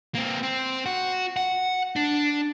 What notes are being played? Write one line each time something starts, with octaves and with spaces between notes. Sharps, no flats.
A#3 C4
C4
F#4
F#5
D4